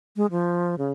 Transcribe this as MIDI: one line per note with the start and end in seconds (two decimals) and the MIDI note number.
0.16 0.26 56
0.31 0.75 53
0.78 0.92 49